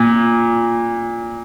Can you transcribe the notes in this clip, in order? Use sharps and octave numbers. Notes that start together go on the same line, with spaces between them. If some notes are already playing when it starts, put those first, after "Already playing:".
Already playing: A#2